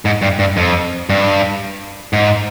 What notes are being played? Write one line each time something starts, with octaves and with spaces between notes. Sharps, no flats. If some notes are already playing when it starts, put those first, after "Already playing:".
G#2
G2
G2
F2
G2
G#2